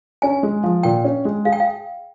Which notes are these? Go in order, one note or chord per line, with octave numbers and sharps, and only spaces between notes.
C#4 G#5
G#3
F3
A#2 G5
C#4
G#3
G#4 F5
G5
F5